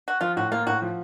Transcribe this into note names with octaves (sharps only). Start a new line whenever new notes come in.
F#4
F3 F4
A2 F#4
A#3 F4
A2 F#4
F3